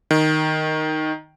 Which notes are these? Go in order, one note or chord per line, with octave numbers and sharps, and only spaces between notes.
D#3